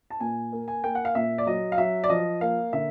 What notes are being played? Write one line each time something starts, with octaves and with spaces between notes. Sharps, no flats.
A5
A#2 G#5
A#3
G#5
A#3 G5
F#5
F5
A#2 E5
D5
F#3 D#5
F5
F#3 E5
D5
F3 D#5
A#3 F5
D3 E5